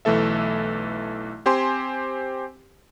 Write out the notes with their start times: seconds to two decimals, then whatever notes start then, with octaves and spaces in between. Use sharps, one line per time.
0.05 B1 E3 A3 A4 E5
1.46 C4 G4 C5 G#5 C6